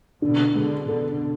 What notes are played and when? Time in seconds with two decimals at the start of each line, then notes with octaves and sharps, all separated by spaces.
0.22 B2 D3 D4
0.56 B2 D3 G#3
0.88 B2 D3 A4